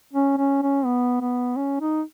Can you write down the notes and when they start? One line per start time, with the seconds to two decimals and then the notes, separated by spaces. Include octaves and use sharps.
0.13 C#4
0.37 C#4
0.62 C#4
0.85 B3
1.21 B3
1.56 C#4
1.81 D#4